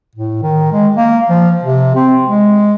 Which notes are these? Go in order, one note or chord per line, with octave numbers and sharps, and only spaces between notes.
A2
D#3
G#3
A#3
F3
C3
C4
G#3